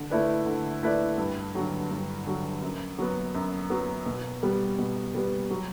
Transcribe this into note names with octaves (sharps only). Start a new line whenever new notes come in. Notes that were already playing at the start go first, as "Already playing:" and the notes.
Already playing: D3
A3 E4 B4 D5
D3
A3 E4 B4 D5
G2
D3 F#3
G2
D3 F#3
F#2
F#3 B3
F#2
F#3 B3
B2
G3 B3
B2
G3 B3
F#3